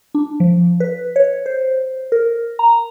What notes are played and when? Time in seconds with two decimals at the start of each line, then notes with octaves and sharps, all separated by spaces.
0.15 D4
0.40 F3
0.80 B4
1.16 C#5
1.46 C5
2.12 A#4
2.59 A#5